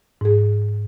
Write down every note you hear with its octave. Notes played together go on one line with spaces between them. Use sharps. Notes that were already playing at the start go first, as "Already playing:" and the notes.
G#2 G#4